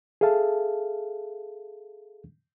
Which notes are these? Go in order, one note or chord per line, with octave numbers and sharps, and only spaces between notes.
G#4 A4 E5 F5 A5